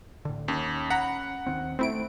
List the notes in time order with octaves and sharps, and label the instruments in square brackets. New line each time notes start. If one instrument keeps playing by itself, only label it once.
[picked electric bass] A2 D3
[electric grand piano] D#2 [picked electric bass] C#4
[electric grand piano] F#5 [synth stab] A#5 B5
[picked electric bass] D#2 D#3 C4
[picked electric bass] A3 [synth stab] C4 E4 D7